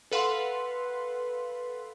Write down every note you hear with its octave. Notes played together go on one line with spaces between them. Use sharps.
A4 B4 F5 F#5 C6